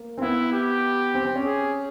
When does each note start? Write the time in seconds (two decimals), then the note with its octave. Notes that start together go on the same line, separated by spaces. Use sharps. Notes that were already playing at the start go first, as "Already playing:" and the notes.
Already playing: A#3
0.18 C4
0.21 B3 E4
0.52 G4
1.14 C4
1.25 C4
1.36 C#4
1.45 G#4